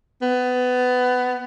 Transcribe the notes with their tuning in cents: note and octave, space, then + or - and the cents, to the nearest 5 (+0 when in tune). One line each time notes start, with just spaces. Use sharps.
B3 +20